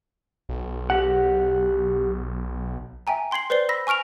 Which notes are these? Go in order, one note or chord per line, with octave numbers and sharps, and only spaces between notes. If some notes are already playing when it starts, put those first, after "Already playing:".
B1
G4 F#5
E5 G5 G#5 A#5
G5 C6 G#6 C7 F#7
B4 C5 D5 C7 G7
B5 E6 A#6 B6
G#5 C#6 F6 D7 F7